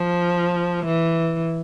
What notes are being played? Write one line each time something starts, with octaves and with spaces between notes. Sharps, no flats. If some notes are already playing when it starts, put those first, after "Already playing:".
Already playing: F3
E3